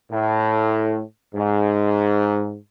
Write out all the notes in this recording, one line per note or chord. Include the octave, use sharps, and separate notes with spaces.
A2
G#2